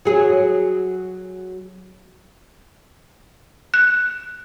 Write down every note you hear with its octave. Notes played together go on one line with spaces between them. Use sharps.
F#3 G#4
F#6